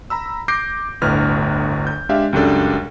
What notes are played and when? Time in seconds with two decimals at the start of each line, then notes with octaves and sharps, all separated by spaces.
0.10 A#5 B5 E6
0.48 D6 G6 A#6 C7 D7
1.01 G1 D2 A2 B4 F6
1.87 G6
2.09 G#3 D4 G4 E5 F5
2.33 C#2 F#2 G3 D4 A4